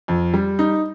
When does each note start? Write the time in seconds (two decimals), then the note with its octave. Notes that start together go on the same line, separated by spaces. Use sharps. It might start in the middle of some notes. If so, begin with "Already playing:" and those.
0.08 F2
0.34 G3
0.59 D#4